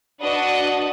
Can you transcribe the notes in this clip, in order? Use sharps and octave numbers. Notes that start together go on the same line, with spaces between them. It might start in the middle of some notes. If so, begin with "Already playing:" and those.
D4 F#4 B4 D#5 F#5